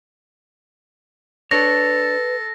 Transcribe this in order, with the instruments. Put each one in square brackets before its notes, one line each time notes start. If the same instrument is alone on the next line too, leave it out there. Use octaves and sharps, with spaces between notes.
[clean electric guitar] D4 C#5 [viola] A4 [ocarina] B4 [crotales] A#6